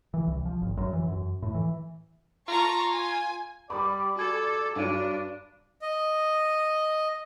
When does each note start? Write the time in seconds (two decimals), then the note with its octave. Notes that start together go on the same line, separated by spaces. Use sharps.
0.14 E3
0.27 C2
0.45 F3
0.62 G#1
0.77 F#2
0.93 E3
1.08 F#2
1.42 A2
1.54 E3
2.48 F4 A5 A#5 C#6
2.89 G#5
3.70 G3 D5 B5 D6 D#6
4.16 F#4 A4 G#6
4.76 G2 F#3 D4 F5 D#7
5.82 D#5